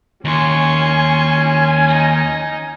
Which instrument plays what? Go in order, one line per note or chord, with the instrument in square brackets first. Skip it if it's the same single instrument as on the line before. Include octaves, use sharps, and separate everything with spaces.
[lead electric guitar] D#2 [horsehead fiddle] C#4 G#5 [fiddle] C6 C#6
[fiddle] D#4 D#5